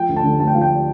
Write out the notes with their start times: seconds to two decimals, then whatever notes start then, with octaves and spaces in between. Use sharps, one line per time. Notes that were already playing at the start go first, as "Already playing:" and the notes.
Already playing: F3 G5
0.09 D2
0.16 A5
0.24 D3
0.40 D2 A5
0.47 G5
0.54 F3 F5
0.61 G5